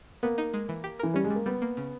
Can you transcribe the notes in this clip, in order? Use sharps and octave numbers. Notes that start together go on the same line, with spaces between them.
A#3 B3
D#4
G#3
E3
G4
E3 A#4
G3 C#4
G#3
G3
A#3
G3 B3
A#3
C#3